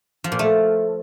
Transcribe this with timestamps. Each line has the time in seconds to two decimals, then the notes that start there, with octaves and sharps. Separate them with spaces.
0.24 F3
0.32 A#2
0.39 A3